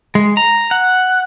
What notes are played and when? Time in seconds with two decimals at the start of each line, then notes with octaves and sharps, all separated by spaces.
0.15 G#3
0.37 A#5
0.71 F#5